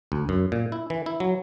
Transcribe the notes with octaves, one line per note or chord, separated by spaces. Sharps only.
D2
F#2
A#2
E4
E3
E4
F#3